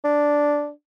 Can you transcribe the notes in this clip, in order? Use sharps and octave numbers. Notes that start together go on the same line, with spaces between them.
D4